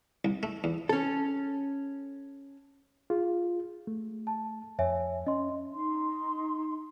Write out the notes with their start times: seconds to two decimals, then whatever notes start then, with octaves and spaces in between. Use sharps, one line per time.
0.25 C2
0.43 A3
0.64 E2
0.89 C#4 A4
3.10 F4 G#4
3.87 A3
4.27 A5
4.79 F2 C#5 E5 G#5
5.27 C#4 D#5 C6
5.73 D#4 C6